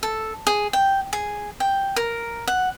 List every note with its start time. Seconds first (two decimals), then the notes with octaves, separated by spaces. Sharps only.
0.03 A4
0.47 G#4
0.73 G5
1.13 G#4
1.60 G5
1.96 A#4
2.47 F#5